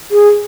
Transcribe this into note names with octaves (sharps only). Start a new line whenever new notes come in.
G#4